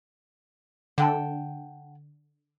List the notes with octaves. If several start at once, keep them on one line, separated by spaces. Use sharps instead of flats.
D3 F#5 G5 A5